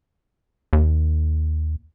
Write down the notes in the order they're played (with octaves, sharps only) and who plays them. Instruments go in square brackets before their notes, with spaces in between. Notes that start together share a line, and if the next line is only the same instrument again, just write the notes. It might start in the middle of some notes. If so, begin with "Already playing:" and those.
[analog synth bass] D#2